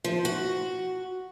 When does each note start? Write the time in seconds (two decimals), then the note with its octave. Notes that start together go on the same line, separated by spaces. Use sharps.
0.04 F3
0.25 F#4